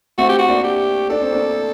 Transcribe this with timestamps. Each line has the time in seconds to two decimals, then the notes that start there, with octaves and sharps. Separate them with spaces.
0.18 A3 C4 F#4
0.29 G4
0.39 F#4
0.49 A#3 D4
0.64 G4
1.10 D4 A4
1.21 C4
1.33 A#3 D4